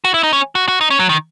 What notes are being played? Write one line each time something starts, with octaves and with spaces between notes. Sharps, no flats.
F#4
E4
D#4
C#4
F#4
F#4
D#4
C#4
F#3
D#3